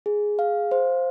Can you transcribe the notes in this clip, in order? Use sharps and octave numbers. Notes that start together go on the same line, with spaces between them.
G#4
F5
C5